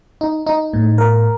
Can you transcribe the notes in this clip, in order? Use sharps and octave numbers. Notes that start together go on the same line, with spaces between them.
D#4
D#4
A2
A#4